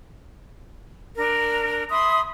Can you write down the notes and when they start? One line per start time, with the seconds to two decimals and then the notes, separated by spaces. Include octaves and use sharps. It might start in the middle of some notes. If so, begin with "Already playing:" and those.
1.17 D4 A#4
1.90 E5 B5 C6 D#6